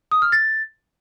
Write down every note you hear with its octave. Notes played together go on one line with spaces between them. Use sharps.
D#6
F6
A6